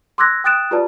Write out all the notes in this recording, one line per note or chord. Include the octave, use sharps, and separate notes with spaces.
C6 D6 E6 F#6 G#6 A#6
G5 D#6 F#6 A6 D7 E7
F4 G4 B4 D5 A5